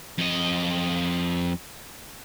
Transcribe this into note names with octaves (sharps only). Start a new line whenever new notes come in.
F2 D#5